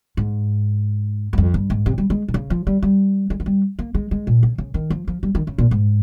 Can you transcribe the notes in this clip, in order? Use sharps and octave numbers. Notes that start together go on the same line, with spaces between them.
G#2
G2
F2
G2
G#2
C3
G3
G#3
C3
C#3
F3
G3
G3
G#3
F3
G3
A#3
G#3
G#3
A#2
C#3
C#3
D#3
F3
F3
G3
D#3
C#3
A#2
G#2